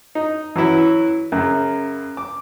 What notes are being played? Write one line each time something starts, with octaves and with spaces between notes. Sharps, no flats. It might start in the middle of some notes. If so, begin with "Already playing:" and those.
D#4
E3 F#3 C#4 E4
F#2 C#3
D6